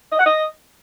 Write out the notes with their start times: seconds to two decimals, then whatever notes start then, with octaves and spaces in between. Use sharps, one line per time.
0.12 D#5
0.19 F#5
0.26 D#5